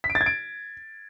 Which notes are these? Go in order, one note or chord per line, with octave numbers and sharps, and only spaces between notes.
B6
D7
A6
G#6
D7